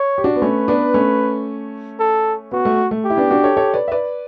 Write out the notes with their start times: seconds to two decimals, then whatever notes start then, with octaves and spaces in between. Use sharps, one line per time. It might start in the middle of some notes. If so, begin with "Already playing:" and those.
Already playing: C#5
0.18 G4
0.24 D4 F#4
0.36 B3
0.42 A3 C#4 B4
0.68 B3 D4
0.94 A3 C#4
1.99 A4
2.52 B3 F#4
2.65 A3
2.91 A3
3.05 G4
3.10 E4
3.17 B3 D4
3.30 D4 F#4
3.43 A4 C#5
3.57 A4 C#5
3.74 B4 D5
3.88 E5
3.92 B4 D5